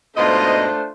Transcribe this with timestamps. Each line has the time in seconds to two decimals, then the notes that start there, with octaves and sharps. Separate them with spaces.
0.17 G#2 B2 A3 D4 F4 C5 D#5